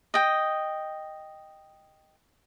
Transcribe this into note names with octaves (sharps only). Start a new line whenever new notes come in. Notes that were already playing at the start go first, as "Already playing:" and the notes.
D#5 G5